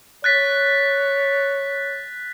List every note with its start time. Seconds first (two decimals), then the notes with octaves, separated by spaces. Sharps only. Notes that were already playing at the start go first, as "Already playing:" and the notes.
0.24 C#5 F#6 A6 B6